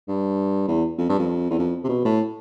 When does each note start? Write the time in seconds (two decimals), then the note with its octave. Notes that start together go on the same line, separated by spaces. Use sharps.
0.08 G2
0.68 E2
0.98 F2
1.09 G2
1.19 F2
1.50 E2
1.59 F2
1.84 C3
1.89 B2
2.05 A2